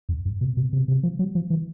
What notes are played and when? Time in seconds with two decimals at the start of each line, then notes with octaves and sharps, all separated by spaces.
0.09 F2
0.25 F#2
0.41 B2
0.57 B2
0.73 C3
0.88 C3
1.03 F3
1.19 F#3
1.35 F3
1.50 E3